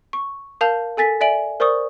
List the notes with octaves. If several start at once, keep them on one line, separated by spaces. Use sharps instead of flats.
C#6
A#4 F5 A5 G6 F7
A4 G#5 A6 B6
D5 E5 G#5 D7 F#7
A#4 C5 D5 C#6 D#6